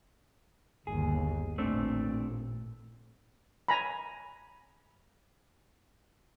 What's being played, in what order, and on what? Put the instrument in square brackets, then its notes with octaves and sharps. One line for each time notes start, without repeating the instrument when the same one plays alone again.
[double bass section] G1 D#2 [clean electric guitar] G#4
[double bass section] A1 A#2 [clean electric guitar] A3 C4 D4
[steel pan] G#5 A#5 B5